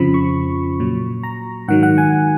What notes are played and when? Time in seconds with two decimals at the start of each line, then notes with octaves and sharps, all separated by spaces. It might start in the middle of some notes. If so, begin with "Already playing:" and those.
Already playing: F2 C#3 F3 B5
0.14 C#6
0.80 A#2 F#3
1.23 A#5
1.68 G#2 D#3 F#3 F#5
1.83 F#5
1.98 G#5